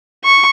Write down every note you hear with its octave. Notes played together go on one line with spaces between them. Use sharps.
C#6